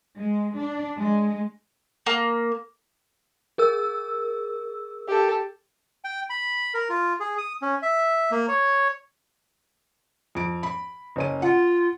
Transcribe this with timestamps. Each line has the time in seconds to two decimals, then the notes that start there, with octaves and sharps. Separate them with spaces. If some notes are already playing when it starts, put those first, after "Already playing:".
0.18 G#3
0.58 D4
0.97 G#3
2.06 A#3
3.58 G#4 A#4 E6
5.08 G4 A4
6.04 G5
6.30 B5
6.74 A#4
6.89 F4
7.20 G#4
7.38 D#6
7.62 C#4
7.82 E5
8.31 A#3
8.48 C#5
10.35 F2 D7
10.63 B5
11.16 F#1 C#4 D#7
11.42 F4 F#5